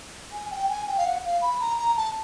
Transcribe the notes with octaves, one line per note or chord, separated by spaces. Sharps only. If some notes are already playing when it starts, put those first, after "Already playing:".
G#5
G5
G#5
G5
F5
F#5
F5
B5
A#5
A#5
A5